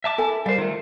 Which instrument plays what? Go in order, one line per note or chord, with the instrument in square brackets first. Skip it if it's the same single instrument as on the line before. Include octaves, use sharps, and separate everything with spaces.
[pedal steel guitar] E5 A5 D6
[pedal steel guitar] E4 [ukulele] A4 G#5 A5
[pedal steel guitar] G3 C5 [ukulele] A#4 F5
[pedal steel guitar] D#3 A3 [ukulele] F4